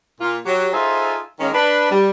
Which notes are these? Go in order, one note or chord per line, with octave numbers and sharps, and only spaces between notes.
A#2 A#3 F4
F#3 G4
D#4 F4 G#4 A4 C5 E5
D#3 G#3 A#3 C#4
D4 B4
G3